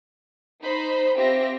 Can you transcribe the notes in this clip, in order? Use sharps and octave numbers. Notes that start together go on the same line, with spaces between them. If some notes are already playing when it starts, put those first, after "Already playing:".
D#4 C5 B5
C4 F4 G4 E5 A#6